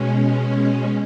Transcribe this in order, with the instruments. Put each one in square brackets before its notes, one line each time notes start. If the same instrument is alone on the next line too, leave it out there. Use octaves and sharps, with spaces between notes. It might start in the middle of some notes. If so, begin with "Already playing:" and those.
Already playing: [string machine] B2 G#3 C#4